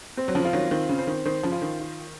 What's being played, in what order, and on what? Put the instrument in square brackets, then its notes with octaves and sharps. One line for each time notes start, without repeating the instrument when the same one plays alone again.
[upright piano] C4
[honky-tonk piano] F#3
C#3 F3
[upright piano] F4
[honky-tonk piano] D#3 F#3
[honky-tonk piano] D#3 [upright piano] C4
[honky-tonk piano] C#3
[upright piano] C5
[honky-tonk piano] D#3
[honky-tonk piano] D#3 [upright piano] C5
[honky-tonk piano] C#3 F3
[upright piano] F4
[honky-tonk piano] D#3
[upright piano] F4